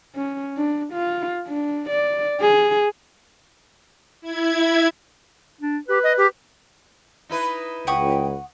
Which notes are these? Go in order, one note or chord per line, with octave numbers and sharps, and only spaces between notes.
C#4
D4
F4
D4
D5
G#4
E4 G#6
D4
G4 B4
D#5
G4
D#4 E4 B4
C#2 F#5 G5 C#6 D#6